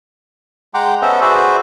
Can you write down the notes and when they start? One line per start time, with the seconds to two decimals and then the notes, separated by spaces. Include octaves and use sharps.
0.74 G#3 F#5 G5 A#5 C6 D6
1.02 B3 C#4 A4 C5 D#5 E5
1.21 F#4 G#4 B4 C5 D5 E5